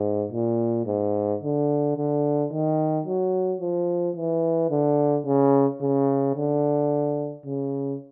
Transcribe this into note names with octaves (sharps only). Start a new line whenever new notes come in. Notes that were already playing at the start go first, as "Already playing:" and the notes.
Already playing: G#2
A#2
G#2
D3
D3
D#3
F#3
F3
E3
D3
C#3
C#3
D3
C#3